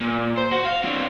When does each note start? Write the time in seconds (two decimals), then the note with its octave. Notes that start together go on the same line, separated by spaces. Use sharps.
0.01 A#2
0.37 C5
0.51 F#4
0.65 F5
0.84 C4 D4